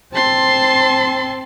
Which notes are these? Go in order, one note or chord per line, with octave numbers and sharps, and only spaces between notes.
C4 A5 C6